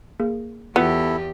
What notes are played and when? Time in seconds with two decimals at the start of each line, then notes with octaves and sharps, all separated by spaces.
0.20 A#3 G#4 A#4
0.76 E2 B3 E4 F4 G4 A4 C#7